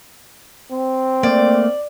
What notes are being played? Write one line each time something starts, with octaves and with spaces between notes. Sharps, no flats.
C4
A3 A#3 D5